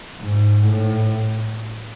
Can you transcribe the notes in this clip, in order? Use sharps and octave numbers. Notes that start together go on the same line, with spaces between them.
G#2
A2